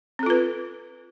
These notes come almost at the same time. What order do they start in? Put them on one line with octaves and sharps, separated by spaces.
C4 A4 F4 B4